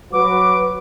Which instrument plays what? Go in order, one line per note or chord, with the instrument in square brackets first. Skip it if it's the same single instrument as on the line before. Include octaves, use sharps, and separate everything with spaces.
[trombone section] F#3 F#4 B4 [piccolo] D6